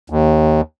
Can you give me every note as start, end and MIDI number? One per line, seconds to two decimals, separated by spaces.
0.10 0.61 39